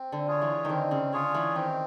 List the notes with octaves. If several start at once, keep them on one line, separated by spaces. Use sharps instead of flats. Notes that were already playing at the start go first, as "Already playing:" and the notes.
Already playing: C4
D3
F4 G#4 C#5
E3
D3 D#3 C4
C#3
D3 F4 G#4 C#5
E3
D#3 C4